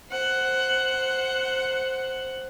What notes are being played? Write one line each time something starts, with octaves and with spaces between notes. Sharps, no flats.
C5 F#5